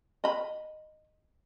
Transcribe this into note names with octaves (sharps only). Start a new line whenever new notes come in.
D#5 B5